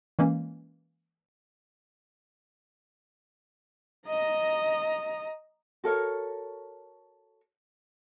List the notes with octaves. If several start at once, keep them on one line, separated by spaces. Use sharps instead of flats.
E3 G#3 A#3 C#4
D#5 A#5
F#4 A4 A#4 C#5